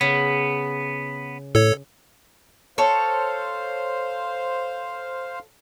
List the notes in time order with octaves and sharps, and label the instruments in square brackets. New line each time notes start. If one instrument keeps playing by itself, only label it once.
[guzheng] C#3 [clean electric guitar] B3
[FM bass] A2 [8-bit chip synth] A4 C#5
[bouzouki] A4 C#5 [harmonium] C5 F5